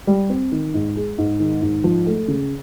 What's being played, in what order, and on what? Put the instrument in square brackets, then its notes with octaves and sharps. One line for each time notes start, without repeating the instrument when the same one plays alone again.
[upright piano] G3
C4
D#3
G#2
G#3
G#2
D#3
G#2
F3
A3
C#3